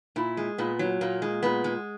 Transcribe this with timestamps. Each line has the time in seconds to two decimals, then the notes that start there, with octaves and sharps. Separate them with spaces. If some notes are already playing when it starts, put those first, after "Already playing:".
0.16 A#2 E4
0.37 G#3
0.58 A#2 B3
0.79 F#3
1.01 A#2 A#3
1.22 G#3
1.43 A#2 B3
1.64 G#3